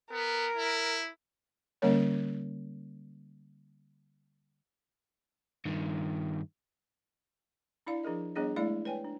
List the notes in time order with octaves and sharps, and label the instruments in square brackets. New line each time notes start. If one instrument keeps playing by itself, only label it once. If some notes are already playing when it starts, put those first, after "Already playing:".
[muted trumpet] B3 [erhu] A#4
[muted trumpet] E4
[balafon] D3 G3 A#3 C#4 A#4 C#5
[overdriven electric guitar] G2 D#3
[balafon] D4 E4 D5 F5
F3 D4 G#4 A#4 D#5
G3 B3 D4 G#4 C#5 D#5
G#3 A3 E4 D5 F5
B4 C#5 G5 G#5
D4